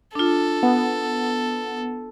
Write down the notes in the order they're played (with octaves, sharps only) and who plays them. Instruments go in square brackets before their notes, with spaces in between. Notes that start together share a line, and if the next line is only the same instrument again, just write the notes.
[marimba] D4 F4 [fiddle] A4
[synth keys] B3